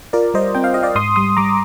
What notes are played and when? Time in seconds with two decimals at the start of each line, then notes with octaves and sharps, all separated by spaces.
0.13 F4 A#4 D5
0.34 G3 C5 D#5
0.55 C4 G5
0.64 F5
0.74 F4 D#5
0.83 D5 F5
0.95 G#2 C6 D#6
1.16 G3 C6 D#6
1.37 G3 A#5 D6